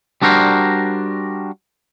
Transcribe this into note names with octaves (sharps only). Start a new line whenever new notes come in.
G3 D4 F#4 A#4 C5